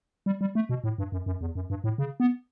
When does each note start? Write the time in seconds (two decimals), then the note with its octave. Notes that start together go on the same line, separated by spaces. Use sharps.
0.26 G3
0.41 G3
0.55 A3
0.69 B2
0.84 A2
0.98 G2
1.12 F#2
1.26 F#2
1.41 E2
1.55 F#2
1.70 G2
1.84 A2
1.98 C#3
2.20 B3